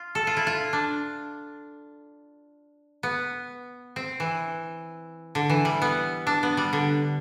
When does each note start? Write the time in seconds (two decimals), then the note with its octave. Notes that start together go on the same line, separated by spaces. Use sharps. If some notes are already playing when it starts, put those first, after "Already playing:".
Already playing: F4
0.15 A4
0.27 F4
0.37 E4
0.47 F4
0.73 D4
3.03 B3
3.96 C4
4.20 E3
5.35 D3
5.50 E3
5.65 G3
5.82 B3
6.27 D4
6.43 B3
6.57 G3
6.73 D3